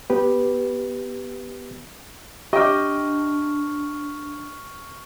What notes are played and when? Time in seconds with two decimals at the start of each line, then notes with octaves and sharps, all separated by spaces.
0.10 B3 G4 B4
2.53 D4 G4 D#5 E5 G5 C#6 F6